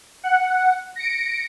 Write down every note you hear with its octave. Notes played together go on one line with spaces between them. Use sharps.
F#5
A#6 C#7 D7